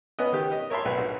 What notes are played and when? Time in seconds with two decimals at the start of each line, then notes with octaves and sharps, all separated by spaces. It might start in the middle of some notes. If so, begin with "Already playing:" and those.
0.19 B3 C#4 B4 D#5
0.32 D#3 G4
0.52 D#5
0.70 A#4 C#5 E5 A5 C6
0.85 B1 B4
0.98 A#1